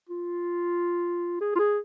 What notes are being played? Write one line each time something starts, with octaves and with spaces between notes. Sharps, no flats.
F4
G#4
F4
G#4